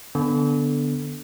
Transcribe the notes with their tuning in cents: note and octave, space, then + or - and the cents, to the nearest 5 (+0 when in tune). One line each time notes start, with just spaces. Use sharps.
D3 +0 B3 +0